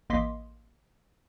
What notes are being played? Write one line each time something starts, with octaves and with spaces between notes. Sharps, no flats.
A1 A#3 D#5 C6 D6 B6